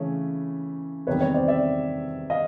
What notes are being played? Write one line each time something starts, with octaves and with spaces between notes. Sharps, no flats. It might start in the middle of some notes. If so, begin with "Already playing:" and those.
Already playing: C#3 E3 A3 C#4
E2 C3 D#3 G3 B4 C#5
B4 C#5
C5 D5
D5 E5
D#5 F5